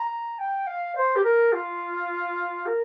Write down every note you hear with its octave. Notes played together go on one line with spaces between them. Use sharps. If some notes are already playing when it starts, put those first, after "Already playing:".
Already playing: A#5
G5
F5
C5
G4
A#4
F4
A#4